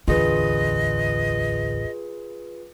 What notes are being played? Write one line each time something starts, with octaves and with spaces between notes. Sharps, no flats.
D1 A1 E2 D3 F4 G#4 B4 D#5